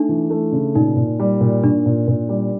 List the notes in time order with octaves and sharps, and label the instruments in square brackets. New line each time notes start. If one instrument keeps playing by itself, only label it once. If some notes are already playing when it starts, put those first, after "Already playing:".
Already playing: [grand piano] A3 [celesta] D4 D#4
[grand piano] E3
A3
C#3
[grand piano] A#2 [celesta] D#4
[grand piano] A#2
G3
A#2
[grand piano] A#2 [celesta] D4
[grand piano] A#2
A#2
G3